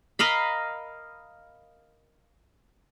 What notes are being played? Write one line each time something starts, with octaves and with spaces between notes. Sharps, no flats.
A#4 D#5 F5 B5